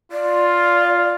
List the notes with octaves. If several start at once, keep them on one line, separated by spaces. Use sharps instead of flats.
F4 D5